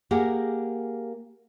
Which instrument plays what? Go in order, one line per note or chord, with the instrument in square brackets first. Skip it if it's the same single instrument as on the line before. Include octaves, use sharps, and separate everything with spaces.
[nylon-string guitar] A#3 G4 G#4 A#4 F#5